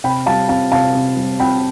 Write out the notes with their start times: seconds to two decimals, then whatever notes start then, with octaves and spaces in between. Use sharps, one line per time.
0.04 C3 G5 B5
0.26 G3 F5 A5
0.49 C4 F5 A5
0.72 C3 F5 A5
0.95 C3
1.17 G3
1.39 C4 G5 B5